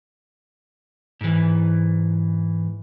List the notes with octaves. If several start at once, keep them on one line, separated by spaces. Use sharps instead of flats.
G#2 E3